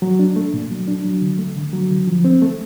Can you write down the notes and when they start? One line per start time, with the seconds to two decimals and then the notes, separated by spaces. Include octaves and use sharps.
0.02 F#3
0.19 D4
0.36 A3
0.54 A#2
0.70 F#3
0.88 D4
1.05 F#3
1.22 D3
1.38 A3
1.57 D3
1.73 F#3
1.91 D3
2.07 F3
2.25 C4
2.42 A3